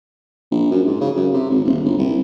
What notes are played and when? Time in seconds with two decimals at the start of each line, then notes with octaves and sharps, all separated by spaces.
0.51 A#1
0.71 F#2
0.87 G#2
1.01 C#3
1.16 F#2
1.33 C3
1.50 G#1
1.65 D#1
1.85 G1
1.98 C2